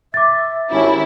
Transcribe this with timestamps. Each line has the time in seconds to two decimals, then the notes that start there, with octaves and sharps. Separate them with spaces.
0.14 E5 D6 A6
0.71 G#1 C#4 E4 G4